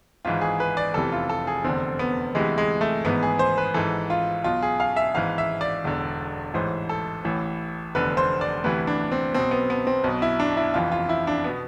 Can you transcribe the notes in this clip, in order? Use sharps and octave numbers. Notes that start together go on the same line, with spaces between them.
G#1 G#2 E3 F4
G#4
B4
D5
F1 E2 C3 E3 A4
F4
A4
G#4
F1 E2 D3 C4
B3
D2 C3 E3 G#3
G#3
A3
G#1 G#2 E3 B3
G#4
C5
B4
G#1 G#2 E3 A4
F4
B1 B2 F4
G#4
F5
E5
G#1 G#2 E3 F5
E5
D5
E1 E2 D3
A1 G#2 E3 C5
A4
A1 A2 E3
F1 E2 D3 B4
C5
D5
D2 C3 E3 B4
D4
C4
B1 B2 C4
B3
B3
C4
B1 B2
E4
D4
E4
F1 F2 E3 F4
F4
E4
D4
B2 B3